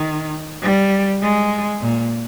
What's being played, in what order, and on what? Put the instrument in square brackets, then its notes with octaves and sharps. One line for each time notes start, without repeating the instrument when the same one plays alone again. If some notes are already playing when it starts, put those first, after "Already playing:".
Already playing: [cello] D#3
G3
G#3
A#2